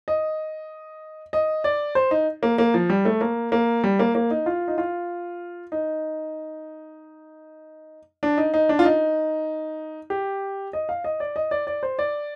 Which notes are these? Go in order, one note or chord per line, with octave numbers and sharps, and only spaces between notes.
D#5
D#5
D5
C5
D#4
A#3
A#3
F3
G3
A3
A#3
A#3
G3
A#3
A#3
D#4
F4
D#4
F4
D#4
D4
D#4
D#4
D4
F4
D#4
G4
D#5
F5
D#5
D5
D#5
D5
D5
C5
D5